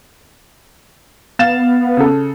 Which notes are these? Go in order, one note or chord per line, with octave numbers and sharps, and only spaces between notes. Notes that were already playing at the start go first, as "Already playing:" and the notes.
B3 F5 A6 E7
C#3 A4